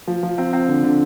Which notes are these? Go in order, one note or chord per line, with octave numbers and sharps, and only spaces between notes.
F3
F3
C4
C4
D3
D3